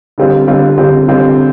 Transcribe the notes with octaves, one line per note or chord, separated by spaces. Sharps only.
D3 G3 C4 F4
D3 G3 C4 F4
D3 G3 C4 F4
D3 G3 C4 F4